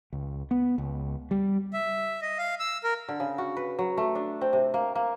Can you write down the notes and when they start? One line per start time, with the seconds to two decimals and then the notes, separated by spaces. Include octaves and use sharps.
0.13 C#2
0.51 B3
0.78 C#2
1.31 G3
1.73 E5
2.22 D#5
2.38 F5
2.60 E6
2.84 A#4
3.08 D3
3.20 C#3
3.38 F#4
3.57 B4
3.79 F#3
3.98 A3
4.15 D4
4.41 C4
4.53 C3
4.74 A#3
4.95 A#3